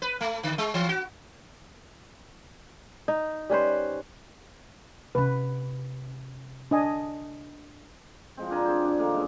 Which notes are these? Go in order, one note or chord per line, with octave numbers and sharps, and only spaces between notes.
B4
A3
D3
G#3
E3
F#4
D#4
G3 C#4 B4 C5
C3 C#4 B4
D4 D#5 G#5
F3 G#3 C4
D4 A#4 G#5 B5
C4 G#4 C5
D4
D#3 A#3 A4
G2 C#3 G#3